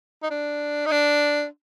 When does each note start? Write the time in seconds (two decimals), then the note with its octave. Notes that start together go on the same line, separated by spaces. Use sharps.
0.23 D#4
0.31 D4
0.86 D#4
0.91 D4